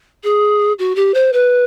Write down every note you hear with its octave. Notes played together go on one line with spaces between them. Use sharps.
G#4
F#4
G4
C5
B4